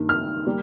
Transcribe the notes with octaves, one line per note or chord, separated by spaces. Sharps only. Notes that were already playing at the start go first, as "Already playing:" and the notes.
Already playing: G2 D#3 A#3
F6
G3 A#3